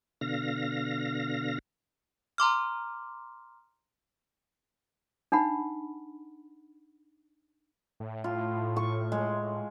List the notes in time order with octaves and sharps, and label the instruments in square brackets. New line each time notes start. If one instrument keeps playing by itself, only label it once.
[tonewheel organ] B2 D3 F5 A#6
[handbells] A#5 C6 D6 F6
[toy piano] D4 D#4 F#5 B5
[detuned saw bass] A2
[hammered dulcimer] F4
C#6
G#3